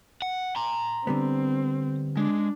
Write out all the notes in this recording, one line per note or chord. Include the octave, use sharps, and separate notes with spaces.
F#5
A#5 C6
D3 G3 B3 C4
G#3 D4